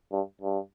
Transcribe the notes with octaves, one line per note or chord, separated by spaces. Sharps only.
G2
G2